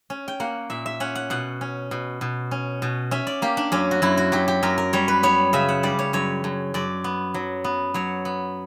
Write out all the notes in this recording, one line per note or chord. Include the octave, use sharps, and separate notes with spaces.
C#4
G5
A#3 F#5
A#2 E5
E5
C#4 F#5
F#5
B2 F#5
C#4
B2
B2
C#4
B2
C#4 E5
D5
A#3 G4
D4
F#2 C#4
F#4
F#2 E4
F#4
F#3 G4
G4
F#2 A#4
A#4
G3 C#5
B4
B3 C#5
C#3 E5
F#5
G3 D5
C#5
F#2 C#5
F#2
F#2 D5
B3
F#3
B3
F#3 C#5
B3